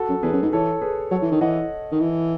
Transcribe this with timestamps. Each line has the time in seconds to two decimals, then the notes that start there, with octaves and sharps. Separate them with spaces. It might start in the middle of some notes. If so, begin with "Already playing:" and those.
Already playing: F#4 A4
0.09 F#2
0.23 E2 G#4 B4
0.33 F#2
0.42 G#2
0.52 E3 A4 C#5
0.82 G#4 B4
1.11 F#3 A4 C#5
1.22 E3
1.31 D#3
1.41 E3 D#5 F#5
1.92 D#3
2.00 E3